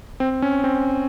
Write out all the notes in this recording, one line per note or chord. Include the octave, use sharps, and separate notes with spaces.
C4
C#4
C4